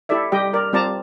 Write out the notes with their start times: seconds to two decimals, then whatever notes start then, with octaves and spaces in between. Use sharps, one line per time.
0.09 E4 G4 A4 D5 E5
0.32 G3 G4 D#5 G5
0.53 A#4 D5
0.73 G3 C4 F4 D5 A5 A#5